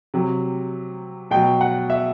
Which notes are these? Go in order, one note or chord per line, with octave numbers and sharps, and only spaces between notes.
C3 F#3
B2 F#3 G5
F#5
E5